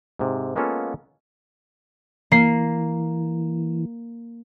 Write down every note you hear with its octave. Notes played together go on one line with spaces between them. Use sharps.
G#2 C3
G#3 A#3 B3 C#4 F4 A4
E3 A#3 C7